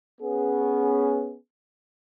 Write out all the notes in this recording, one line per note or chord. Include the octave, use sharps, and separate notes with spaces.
B3 C#4 G#4